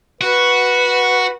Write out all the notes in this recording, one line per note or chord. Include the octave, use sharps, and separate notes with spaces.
F#4 B4